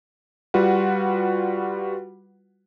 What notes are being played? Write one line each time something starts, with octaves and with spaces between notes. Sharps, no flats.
G3 F4 F#4 B4 F#5